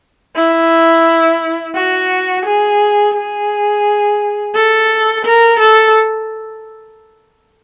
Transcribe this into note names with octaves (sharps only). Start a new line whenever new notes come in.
E4
F#4
G#4
G#4
A4
A#4
A4